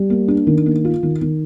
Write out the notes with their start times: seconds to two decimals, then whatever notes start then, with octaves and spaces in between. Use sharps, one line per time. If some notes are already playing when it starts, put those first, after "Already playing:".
Already playing: G3
0.10 A#3
0.28 D4
0.47 D#3
0.66 A#3
0.85 F4
1.03 D#3
1.21 D#3